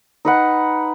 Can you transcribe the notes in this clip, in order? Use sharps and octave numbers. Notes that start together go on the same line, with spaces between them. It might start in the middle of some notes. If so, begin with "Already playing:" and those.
D#4 B4 F#5